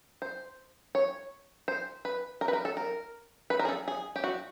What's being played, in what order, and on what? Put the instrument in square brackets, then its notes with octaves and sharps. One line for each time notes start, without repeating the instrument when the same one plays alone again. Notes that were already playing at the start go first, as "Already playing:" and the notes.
[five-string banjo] C5
C#5
C5
B4
A#4
B4
A#4
A4
A#4
B4
A#4
G#4
A4
G#4
G4
F#4